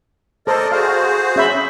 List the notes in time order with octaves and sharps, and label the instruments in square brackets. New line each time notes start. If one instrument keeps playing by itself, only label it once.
[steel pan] A4 C5 [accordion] A#4 D5 D#5
[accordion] F#4 G#4 C5 [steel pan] F5
[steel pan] C#4 E5 B5